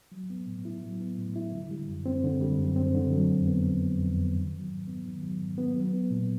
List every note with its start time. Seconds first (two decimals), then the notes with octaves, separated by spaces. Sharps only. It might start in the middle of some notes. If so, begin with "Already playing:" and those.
0.12 F#3
0.30 B3
0.47 A2
0.65 E4
0.83 F#3
1.00 B3
1.18 A2
1.36 E4
1.52 D3
1.71 G3
1.88 F#2
2.06 C4
2.24 D3
2.41 G3
2.58 F#2
2.76 C4
2.95 D3
3.12 F#3
3.29 F2
3.47 B3
3.64 D3
3.81 F#3
3.99 F2
4.17 B3
4.35 D#3
4.53 F#3
4.70 G#2
4.87 B3
5.05 D#3
5.22 F#3
5.41 G#2
5.58 B3
5.76 F#3
5.93 B3
6.11 A#2